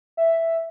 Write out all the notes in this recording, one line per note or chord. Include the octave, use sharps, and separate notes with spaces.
E5